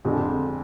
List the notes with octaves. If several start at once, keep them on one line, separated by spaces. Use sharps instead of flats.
F2 D3 G#3